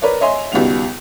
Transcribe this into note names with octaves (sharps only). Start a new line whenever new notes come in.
A#4 B4 C#5 D5
C#5 D#5 E5 G#5 C6
C#2 B2 D#3 G3 B3 F7